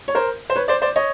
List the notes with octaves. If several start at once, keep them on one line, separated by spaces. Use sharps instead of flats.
C#5
A#4 C5
C5
B4 C#5
C5 D5
C5 D5
C#5 D#5